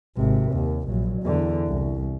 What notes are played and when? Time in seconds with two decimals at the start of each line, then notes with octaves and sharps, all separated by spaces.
0.17 G#1 C3
0.51 D#2
0.87 A#1 F#3
1.23 E2 D3
1.67 C2